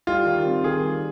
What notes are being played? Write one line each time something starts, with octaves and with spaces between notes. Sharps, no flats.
G3 F4
D#3
C4
D#3 G#4
G3